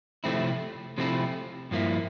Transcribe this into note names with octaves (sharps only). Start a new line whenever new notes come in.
C3 F3 A3 C4 E4
C3 F3 A3 C4 E4
G2 F3 A#3 E4